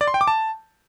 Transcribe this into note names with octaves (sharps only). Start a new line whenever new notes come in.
D5
C6
G5
D6
A5